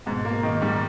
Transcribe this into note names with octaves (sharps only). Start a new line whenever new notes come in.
G#2 B2
B2 A#3
A#2 D#3
G#2 G3